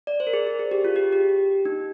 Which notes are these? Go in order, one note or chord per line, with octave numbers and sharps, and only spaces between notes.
D5
C5
A#4
G#4
G#4
G#4
G4
F4
G4
G4
D#4